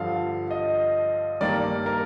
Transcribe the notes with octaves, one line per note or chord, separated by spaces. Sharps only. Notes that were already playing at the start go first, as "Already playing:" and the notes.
Already playing: G2 D3 F3 F5
D#5
G2 D#3 G3 A#3 D5
A#4